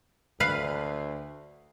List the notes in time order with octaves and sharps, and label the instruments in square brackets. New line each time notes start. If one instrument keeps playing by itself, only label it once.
[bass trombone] D2 [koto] B4 F5